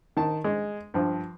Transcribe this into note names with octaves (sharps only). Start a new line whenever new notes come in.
D#3 A5
G#3
G2 F3